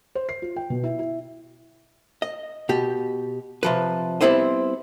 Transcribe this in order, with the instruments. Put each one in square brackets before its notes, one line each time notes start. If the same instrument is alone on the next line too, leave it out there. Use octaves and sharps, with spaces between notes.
[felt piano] C5
C7
F4
G5
B2
E4
E4
[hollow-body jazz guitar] D#5
B2 G4
C3 F3 B4
G3 B3 C4 E4 C5 D#5